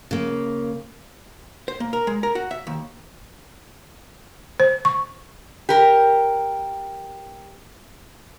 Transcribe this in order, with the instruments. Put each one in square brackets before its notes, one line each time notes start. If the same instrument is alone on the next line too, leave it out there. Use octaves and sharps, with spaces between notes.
[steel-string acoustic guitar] C#3 A#3
[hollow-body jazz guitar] C5
A#3
A#4
G#3
A#4
F#4
E5
D#2
[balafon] C5
C#6
[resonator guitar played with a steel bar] G4 A#4